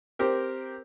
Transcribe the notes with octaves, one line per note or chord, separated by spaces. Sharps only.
C4 G4 A#4